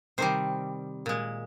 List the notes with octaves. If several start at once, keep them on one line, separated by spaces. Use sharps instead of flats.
C3 D#3 G3 C5
A#2 G#3